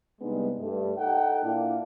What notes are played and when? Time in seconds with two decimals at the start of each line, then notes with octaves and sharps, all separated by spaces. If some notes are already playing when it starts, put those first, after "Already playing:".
0.21 C3 G3 G#3 B3 D4 D#4
0.61 G2 A3
0.97 D#4 A4 F#5 G5
1.44 A#2 A#3 D4 E4